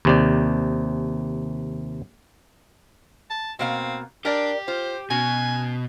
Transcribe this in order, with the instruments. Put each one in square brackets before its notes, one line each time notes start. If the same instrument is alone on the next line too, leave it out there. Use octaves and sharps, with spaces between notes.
[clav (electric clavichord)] D#2 C3 D5
[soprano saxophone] A5
[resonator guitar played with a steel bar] B2 A#3 F5 [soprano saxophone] C4
[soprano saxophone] D4 [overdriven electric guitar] G4 [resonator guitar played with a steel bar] A#4 D5
[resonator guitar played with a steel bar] F4 [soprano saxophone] C5
[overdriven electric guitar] B2 [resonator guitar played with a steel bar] C#4 F#4 [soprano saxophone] G#5